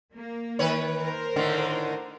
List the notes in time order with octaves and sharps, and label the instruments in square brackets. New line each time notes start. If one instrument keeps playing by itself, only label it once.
[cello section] A#3
[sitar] D#3 B4 C#5
[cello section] A#4 C5
[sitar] A2 D3 D#3